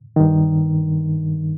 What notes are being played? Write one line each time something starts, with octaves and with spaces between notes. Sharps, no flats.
G2 D#3